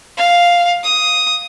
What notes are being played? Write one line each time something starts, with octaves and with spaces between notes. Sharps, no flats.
F5
D#6